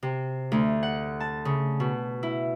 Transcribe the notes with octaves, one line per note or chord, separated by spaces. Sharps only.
C3
D2
F#5
A5
C#3
B2
E4